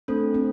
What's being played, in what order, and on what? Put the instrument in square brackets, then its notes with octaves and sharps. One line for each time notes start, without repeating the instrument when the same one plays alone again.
[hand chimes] A3 D4 A4 C5 [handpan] C4
[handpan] C4